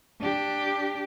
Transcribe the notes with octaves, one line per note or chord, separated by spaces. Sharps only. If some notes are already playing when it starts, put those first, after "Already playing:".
D4 G4